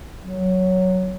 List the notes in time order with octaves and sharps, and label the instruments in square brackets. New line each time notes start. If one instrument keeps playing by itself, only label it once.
[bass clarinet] F#3